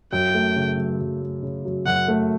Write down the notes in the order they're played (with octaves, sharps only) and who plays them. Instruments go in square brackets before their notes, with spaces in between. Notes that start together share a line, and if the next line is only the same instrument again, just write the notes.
[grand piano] F#2 [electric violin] G5
[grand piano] A3
C#3
F#3
F#2
A3
C#3
F#3
[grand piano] F#2 [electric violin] F#5
[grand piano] A3